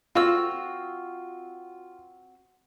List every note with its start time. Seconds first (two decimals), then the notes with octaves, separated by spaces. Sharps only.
0.15 C4 F4 F#4 E6